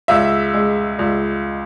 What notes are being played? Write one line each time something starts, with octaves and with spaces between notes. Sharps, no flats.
C#2 E5
G#3
C#2